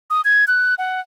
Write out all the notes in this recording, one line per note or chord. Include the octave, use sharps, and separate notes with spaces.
D#6
G#6
F#6
F#5